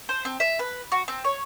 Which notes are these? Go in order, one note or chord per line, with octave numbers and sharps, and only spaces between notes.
C5
C4
E5
B4
F#4
C4
C#5